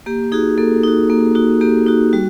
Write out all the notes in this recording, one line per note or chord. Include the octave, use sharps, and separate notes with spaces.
A#3 G4
D#4 F#4 G#4
A#3 A4
D#4 F#4
A#3
D#4 F#4
A#3 G4
D#4 F#4
G3 F#4